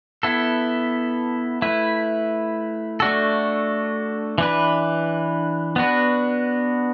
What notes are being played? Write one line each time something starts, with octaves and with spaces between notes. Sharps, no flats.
B3 E4 A4
A3 E4 B4
A3 D4 F#4 A4
E3 D4 B4
B3 D4 F#4 B4